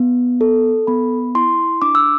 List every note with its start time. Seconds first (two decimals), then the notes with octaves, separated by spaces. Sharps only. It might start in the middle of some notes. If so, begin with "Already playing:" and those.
Already playing: B3
0.41 A4
0.87 B3 B5
1.35 E4 C6
1.82 D4 D6
1.95 E6